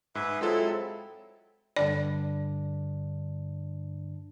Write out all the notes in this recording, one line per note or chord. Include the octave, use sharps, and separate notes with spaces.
G#2 G#4 B4 E5
F#3 G#3 C4 E4 F4 A4
G2 D3 D4 D5